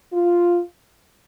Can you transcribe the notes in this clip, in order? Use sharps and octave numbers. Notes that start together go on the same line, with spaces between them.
F4